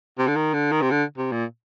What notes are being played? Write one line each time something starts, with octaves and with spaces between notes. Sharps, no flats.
C3
D3
D#3
D3
D#3
C3
D3
C3
A#2